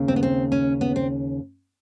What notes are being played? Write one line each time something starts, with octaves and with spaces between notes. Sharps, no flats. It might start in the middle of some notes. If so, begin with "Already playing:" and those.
Already playing: D#2 C#3
C4
B3
C4
C#4
B3
C4